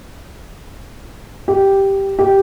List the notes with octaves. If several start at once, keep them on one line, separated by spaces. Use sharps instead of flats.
G4
G4